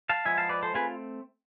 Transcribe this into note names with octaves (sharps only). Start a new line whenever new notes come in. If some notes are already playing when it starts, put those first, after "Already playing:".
F5 A5
F3 G#3 B3 E4 E5 G#5
F5 A5
B4 D5
A4 C5
A3 C4 F4 G#4 B4